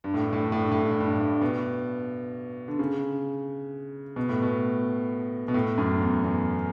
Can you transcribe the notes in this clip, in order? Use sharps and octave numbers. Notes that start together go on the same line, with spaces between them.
G2
A2
G2
A2
G2
A2
G2
A2
G2
A2
G2
A2
G2
B2
D3
C#3
B2
A2
B2
B2
A2
F#2
E2
E2